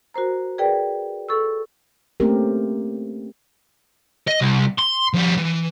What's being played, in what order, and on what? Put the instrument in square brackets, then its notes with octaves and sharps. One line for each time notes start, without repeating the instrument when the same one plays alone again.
[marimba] F#4 A#4 C5 A#5
G#4 A#4 B4 D5 G5
A4 C#6 E6
[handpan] A3 A#3 C4 C#4 G4 A#4
[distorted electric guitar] D#5
C2
C6
F3 G3
E3